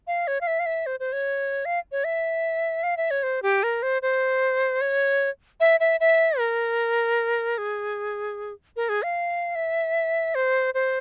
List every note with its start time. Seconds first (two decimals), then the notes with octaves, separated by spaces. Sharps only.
0.07 F5
0.27 C#5
0.41 F5
0.47 E5
0.60 F5
0.66 E5
0.86 C5
1.00 C5
1.13 C#5
1.65 F5
1.92 C#5
2.04 E5
2.83 F5
2.97 E5
3.11 C#5
3.23 C5
3.43 G4
3.63 A#4
3.83 C5
4.02 C5
4.81 C#5
5.60 E5
5.80 E5
6.00 E5
6.39 A#4
7.58 G#4
8.76 A#4
8.89 G#4
9.03 F5
9.55 E5
10.35 C5
10.74 C5